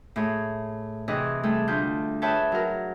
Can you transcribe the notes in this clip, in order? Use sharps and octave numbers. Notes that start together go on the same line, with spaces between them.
A2 G#4 C#5
C3 E3 E4 G#4 D#5
G3 A3 G#4 A4
D2 F4 G6
G#4 B4 C#5 E5 G5 A5
F#3 A#4